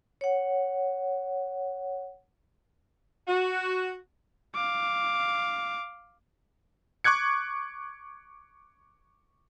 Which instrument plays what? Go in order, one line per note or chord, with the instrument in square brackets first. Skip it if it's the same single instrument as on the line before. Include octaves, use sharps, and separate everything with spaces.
[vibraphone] C#5 F#5
[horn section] F#4
[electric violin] F5 D6
[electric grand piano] C#6 D6 F#6 G#6 C#7